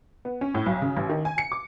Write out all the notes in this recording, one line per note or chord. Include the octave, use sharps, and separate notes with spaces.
B3
C#4
A2
B1
C#3
A1
D#3
G#5
C#7
D6